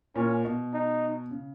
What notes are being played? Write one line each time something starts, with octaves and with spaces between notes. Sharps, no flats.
A#2 C#4
B2
D#4
C#3